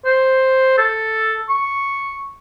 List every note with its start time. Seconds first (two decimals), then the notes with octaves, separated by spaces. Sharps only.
0.05 C5
0.78 A4
1.49 C#6